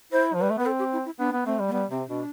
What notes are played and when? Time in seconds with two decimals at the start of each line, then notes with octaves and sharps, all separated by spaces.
0.12 E4 C5
0.34 F3
0.39 B4
0.42 G3
0.50 A3
0.58 B3 B4
0.66 C4 A4
0.79 G4
0.93 E4
1.06 E4
1.19 B3 D4
1.32 B3
1.45 A3 C4
1.59 G3
1.68 A3
1.72 G3 B3
1.90 C3 C4
2.08 B2 D4